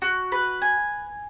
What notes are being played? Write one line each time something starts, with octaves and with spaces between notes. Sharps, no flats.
F#4
B4
G#5